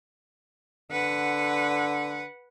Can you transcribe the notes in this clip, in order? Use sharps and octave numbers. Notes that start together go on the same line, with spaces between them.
D3 B4 F#5